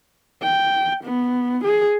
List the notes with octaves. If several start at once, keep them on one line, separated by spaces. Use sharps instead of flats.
G5
B3
G#4